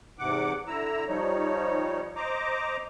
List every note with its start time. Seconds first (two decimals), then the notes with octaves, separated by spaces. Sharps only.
0.19 E2 G#2 C3 F#5 D6
0.67 D3 E4 A#5 E6
1.08 F3 G3 D#4 C#5
2.16 C5 D#5 A#5 D6